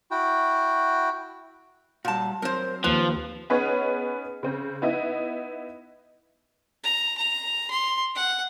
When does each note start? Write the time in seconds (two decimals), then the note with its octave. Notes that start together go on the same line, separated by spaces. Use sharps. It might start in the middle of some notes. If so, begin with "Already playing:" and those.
0.11 E4 F#4 G5
2.05 A#2 G3 F#4 A5
2.42 F#3 C4 A#4 C5
2.84 D#2 F3 B4
3.50 B3 C#4 D#4 G#4 B4 C#5
4.43 C#3 C4
4.82 B3 D#4 E4
6.83 A#5
7.18 A#5
7.71 C6
8.15 F#5